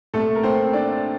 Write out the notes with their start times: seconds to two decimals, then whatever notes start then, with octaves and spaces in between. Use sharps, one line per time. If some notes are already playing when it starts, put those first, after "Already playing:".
0.14 C2 A#2 A3 A4
0.35 A#4
0.43 C4 C5
0.73 D4 D5